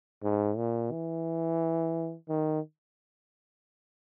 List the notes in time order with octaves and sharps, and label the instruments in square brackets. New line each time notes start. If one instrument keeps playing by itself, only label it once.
[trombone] G#2
A#2
E3
D#3